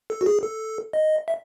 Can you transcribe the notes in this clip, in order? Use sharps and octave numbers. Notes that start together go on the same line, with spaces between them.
A4
F#4
G#4
A4
D#5
E5